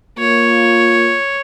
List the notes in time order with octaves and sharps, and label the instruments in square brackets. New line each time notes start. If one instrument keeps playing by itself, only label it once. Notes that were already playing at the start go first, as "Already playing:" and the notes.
[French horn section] A#3 F4 [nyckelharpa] C#5